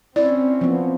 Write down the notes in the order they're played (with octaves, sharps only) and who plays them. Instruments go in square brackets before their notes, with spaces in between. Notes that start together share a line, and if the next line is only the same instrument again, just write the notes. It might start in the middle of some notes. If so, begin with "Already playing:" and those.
[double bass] C4 C#4 [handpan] E4 [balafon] D5
[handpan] F3 B3